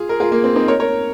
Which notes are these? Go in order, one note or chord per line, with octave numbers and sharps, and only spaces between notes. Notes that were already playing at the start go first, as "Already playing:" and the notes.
Already playing: F4 G#4
A#4
F4 G#4
A#3
C4
C4 D#4
A#4 C#5
A#4 C#5